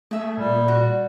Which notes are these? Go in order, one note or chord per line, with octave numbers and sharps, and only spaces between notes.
A3 G#4 E5
A#2 G3 D5
F#4